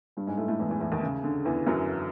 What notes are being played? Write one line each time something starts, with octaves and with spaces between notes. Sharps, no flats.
G2 G3
G#2 G#3
A2 A3
A2 A3
E2 E3
E2 E3
E2 E3
D#2 D#3
C#3
D3
E2 E3
F#2 F#3